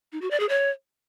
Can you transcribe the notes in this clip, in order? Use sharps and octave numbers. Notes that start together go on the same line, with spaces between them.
D#4
F#4
D5
G#4
C#5